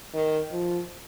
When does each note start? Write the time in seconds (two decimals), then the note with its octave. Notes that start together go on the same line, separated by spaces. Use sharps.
0.14 D#3
0.52 F3